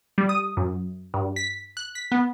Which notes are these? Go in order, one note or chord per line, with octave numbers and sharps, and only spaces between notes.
G3
D#6
F#2
G2
B6
F#6
B6
B3